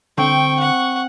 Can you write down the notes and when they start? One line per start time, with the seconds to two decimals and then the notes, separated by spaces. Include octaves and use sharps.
0.18 D3 C4 G5 C#6
0.59 F#5